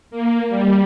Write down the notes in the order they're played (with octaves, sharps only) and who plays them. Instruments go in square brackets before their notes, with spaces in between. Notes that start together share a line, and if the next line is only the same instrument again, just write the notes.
[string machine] A#3
G3